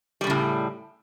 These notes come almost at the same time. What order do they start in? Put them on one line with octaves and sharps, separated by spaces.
G3 E2 C#3 A2